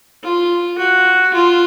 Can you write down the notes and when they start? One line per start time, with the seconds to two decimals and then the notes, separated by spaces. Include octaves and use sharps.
0.23 F4
0.79 F#4
1.34 F4